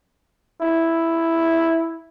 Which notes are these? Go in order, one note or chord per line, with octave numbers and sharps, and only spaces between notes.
E4